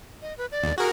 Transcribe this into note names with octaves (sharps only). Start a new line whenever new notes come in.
D#5
B4
D5
D#2
F#4 G#4 A#4